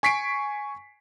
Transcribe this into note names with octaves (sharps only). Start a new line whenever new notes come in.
G#5 C#6 B6 C7 D7